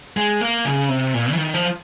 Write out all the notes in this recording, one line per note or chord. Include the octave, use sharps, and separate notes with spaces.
G#3
A#3
C#3
C3
A#2
F3
D#3
F3